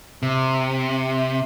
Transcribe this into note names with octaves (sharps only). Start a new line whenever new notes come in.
C3